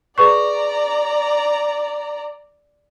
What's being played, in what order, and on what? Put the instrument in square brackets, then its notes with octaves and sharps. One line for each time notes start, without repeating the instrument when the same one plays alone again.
[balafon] G#4 B4 C#6 [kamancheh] D5 A#5